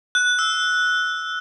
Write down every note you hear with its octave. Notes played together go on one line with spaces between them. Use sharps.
F#6
E6